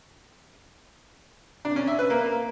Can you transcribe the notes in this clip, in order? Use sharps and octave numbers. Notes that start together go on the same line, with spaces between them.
D4
C#4
E5
B4
A#3